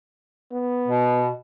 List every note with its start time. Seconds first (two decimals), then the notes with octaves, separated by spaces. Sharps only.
0.53 B3
0.88 B2